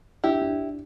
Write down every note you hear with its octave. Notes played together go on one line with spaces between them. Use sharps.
D4 E4 G4
D4